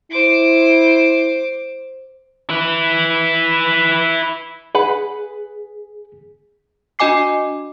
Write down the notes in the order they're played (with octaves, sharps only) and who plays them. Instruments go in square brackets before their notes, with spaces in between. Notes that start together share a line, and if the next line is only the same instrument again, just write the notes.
[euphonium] E4 [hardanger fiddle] C5 D6
[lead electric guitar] E4 B4
[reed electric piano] G#4 [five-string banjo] B4 F#5 B5
[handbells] D4 F#4 D#5 G#5 D6 C7